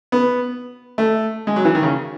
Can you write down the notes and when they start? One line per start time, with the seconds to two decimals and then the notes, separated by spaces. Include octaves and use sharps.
0.12 B3
0.98 A3
1.47 G#3
1.56 F#3
1.65 E3
1.75 D#3
1.83 C#3